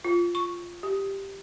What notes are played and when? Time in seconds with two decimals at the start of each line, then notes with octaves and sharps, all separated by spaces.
0.05 F4
0.35 C#6
0.83 G4